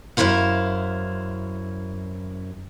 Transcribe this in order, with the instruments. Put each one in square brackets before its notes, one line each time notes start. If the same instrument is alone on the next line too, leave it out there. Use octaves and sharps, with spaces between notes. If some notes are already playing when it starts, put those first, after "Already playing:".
[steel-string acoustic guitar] F#2 C3 E4 C5 F5